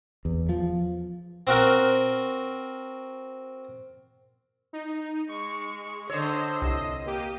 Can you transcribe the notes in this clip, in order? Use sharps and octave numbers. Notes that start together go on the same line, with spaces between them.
E2
F3
C4 F#4 A#4
D#4
G#3 C#6
D3 C5 C#5 D#5 E6 C7
C2 D#5
A#3 G4 D#7